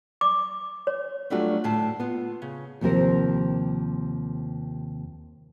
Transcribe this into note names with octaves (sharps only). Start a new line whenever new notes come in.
D6
C#5
F#3 G3 A3 D4 F4 F#4
D2 A2 A5
B3 F4
C#3
D#2 C3 F3 C4 A#4